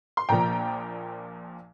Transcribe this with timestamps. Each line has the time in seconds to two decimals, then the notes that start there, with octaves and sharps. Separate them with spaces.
0.17 C6
0.29 A#1 A#2 F3 G5 A#5